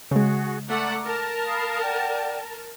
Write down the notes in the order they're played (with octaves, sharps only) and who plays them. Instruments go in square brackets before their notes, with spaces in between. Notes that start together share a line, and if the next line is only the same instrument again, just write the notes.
[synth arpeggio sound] C#3 G#3 [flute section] F#4 G#4
[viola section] A3 D5 F#5 [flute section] A#5 D6
[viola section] A#4 A5
[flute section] F5 B5 D#6
D5 F#5 G5